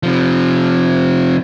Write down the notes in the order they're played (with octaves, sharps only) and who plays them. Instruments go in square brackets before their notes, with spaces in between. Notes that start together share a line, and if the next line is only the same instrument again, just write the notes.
[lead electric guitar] C3 F3